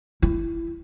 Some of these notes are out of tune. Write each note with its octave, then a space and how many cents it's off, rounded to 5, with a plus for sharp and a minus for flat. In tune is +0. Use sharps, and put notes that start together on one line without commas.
E4 +20